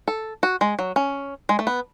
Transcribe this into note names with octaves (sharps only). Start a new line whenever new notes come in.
A4
F#4
G#3
F#3
C#4
G#3
A3
B3